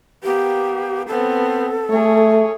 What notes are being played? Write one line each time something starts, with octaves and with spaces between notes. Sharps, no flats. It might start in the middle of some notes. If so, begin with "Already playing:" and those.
A#3 B3 G4
B3 C4 A4
A3 G#4 C#5